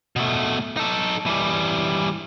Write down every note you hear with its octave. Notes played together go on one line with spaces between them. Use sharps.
B2 A3
D#4 A4
E3 G3